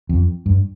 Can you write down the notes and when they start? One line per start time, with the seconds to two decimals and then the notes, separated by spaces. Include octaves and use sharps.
0.09 F2
0.46 G2